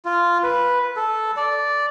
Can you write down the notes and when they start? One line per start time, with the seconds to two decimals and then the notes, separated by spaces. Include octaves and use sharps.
0.05 F4
0.43 B4
0.96 A4
1.37 D5